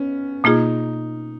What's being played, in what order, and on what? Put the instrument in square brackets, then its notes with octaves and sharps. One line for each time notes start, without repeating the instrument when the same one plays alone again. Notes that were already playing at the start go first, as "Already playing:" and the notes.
Already playing: [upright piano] B3 C#4
[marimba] B2 A#3 F4 G#4 [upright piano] D#4